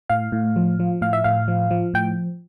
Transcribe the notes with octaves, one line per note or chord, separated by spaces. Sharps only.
A2 F5
A2
F3
F3
A2 F5
E5
A2 F5
F3
F3
A2 G5